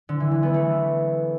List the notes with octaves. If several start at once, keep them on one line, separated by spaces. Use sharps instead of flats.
D3
E3
E3
B3
A3